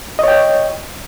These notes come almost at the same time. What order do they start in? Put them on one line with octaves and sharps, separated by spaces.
D#5 C#5 G5